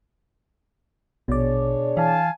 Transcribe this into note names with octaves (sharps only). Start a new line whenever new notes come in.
A#1 B2 D4 G#4 C#5 D5
E3 F5 G#5 A5